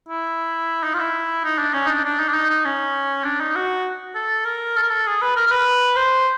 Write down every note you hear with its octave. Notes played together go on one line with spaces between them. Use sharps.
E4
D#4
F4
E4
D#4
D4
C#4
D#4
D4
D4
D#4
D4
D#4
D#4
C#4
D4
D#4
F#4
A4
A#4
A4
A#4
A4
G#4
B4
A#4
A#4
B4
C5